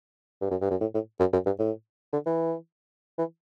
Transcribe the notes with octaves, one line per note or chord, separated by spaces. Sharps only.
G2
F#2
G2
F#2
A2
A2
F#2
F#2
G2
A2
D3
E3
E3